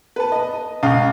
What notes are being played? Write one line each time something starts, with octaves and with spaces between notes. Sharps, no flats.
B4 A5
D#5
C#2 F5